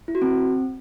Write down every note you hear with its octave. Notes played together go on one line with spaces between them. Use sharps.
E4
F#4
C4